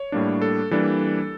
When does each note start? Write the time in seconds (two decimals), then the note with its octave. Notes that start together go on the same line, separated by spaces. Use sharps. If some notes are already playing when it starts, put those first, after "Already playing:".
Already playing: C#5
0.12 A2 G3 A#3 D4
0.42 A4
0.71 E3 G3 A#3 D4 A4